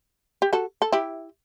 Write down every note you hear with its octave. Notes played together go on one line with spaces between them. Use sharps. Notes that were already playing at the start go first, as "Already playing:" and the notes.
G4
F#4 A4
A4
E4 G4